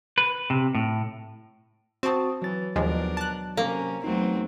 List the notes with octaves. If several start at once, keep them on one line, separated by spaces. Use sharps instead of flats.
B4
C3
A2
C4 F#4 A5 C#6 D#6
E3 F#3 A6
D#2 B2 F3 G#3 D4 A#4
A5 F#6
C3 A#3 C#4
E2 F#3 A3 C4 D#4